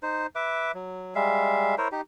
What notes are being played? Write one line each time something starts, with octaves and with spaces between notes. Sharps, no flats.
D#4 C5
B4 E5 D6
F#3
G3 G#3 E5 F5
E4 A#4 C5 C#5
D#4 G4